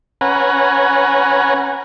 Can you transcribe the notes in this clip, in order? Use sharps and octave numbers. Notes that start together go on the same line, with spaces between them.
C#4 B4 F#5 G#5 A#5